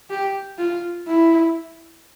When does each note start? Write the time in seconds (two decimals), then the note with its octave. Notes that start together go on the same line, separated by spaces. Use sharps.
0.10 G4
0.58 F4
1.07 E4